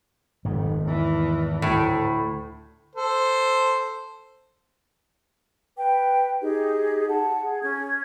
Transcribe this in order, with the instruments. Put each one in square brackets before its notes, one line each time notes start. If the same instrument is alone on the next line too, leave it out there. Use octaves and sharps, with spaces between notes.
[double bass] F1 [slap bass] G#2 D#3
[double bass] E2 E3
[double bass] D2 [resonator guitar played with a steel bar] A2
[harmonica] A4 C5
[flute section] B4 G5
D#4 G4 G#4
F#5 A5
G#4
C#4 G#6